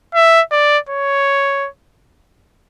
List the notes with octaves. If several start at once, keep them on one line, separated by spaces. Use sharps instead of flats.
E5
D5
C#5